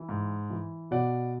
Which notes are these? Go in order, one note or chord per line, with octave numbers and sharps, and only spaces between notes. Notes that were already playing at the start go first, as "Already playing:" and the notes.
Already playing: E3
G#2
E3
B2 D5 F#5